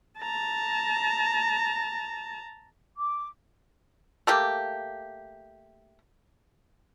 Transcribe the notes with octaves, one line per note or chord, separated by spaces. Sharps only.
A5 A#5
D6
A3 A#3 G4